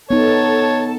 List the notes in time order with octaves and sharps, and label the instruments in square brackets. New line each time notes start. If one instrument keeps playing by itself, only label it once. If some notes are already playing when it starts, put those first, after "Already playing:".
[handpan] B3 D#4 [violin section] A4 A5 [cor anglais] C#5